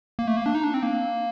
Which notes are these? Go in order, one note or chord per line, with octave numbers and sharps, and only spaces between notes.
A#3
A3
A#3
D4
D#4
D4
C4
A#3